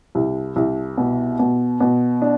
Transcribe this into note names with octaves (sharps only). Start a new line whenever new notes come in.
C2
C2
B2
B2
B2
D4